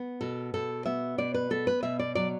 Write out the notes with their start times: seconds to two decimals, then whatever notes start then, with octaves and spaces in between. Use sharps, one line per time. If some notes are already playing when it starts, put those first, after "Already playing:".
Already playing: B3
0.21 B2 A4
0.54 B2 A4
0.86 B3 E5
1.18 B2 D5
1.34 B4
1.50 B3 A4
1.67 B4
1.83 B2 E5
1.99 D5
2.15 F#3 D5